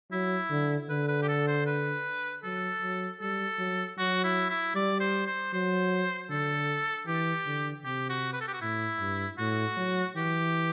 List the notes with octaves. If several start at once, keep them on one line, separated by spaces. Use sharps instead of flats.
F#3 E4
D3
D3 B4
B4
G4
A4
C5
B4
F#3 A4
F#3
G3 A4
F#3
F#3 F#4
E4
E4
G3 D5
C5
C5
F#3 C5
D3 A4
E3 G4
D3
C3 G4
F#4
B4
A4
G4
F#4
A2 E4
G2
A2 F#4
F#3
E3 G4